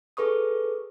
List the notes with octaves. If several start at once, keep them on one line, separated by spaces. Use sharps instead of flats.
G#4 A4 B4 C#6 D#6